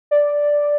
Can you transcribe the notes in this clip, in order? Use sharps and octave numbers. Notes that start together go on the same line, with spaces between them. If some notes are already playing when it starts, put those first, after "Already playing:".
D5